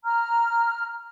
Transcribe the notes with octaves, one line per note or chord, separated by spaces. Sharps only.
A#5 F6